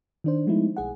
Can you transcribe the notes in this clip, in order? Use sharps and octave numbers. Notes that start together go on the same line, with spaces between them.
D#3 D4 C5
F3 G#3 A3 B3 D#4 E4
B1 G#4 F#5